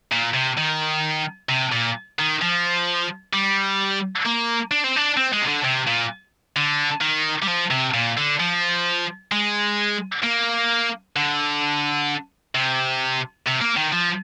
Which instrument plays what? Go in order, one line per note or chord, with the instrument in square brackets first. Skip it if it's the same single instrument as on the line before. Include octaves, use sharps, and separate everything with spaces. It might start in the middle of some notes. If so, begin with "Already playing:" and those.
[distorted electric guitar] A#2
C3
D#3
C3
A#2
D#3
F3
G3
A#3
D4
C4
D4
C4
G#3
C3
D3
C3
A#2
D3
D#3
G3
F3
C3
A#2
D3
F3
G#3
A#3
D3
C3
C3
A#3
D#3
F3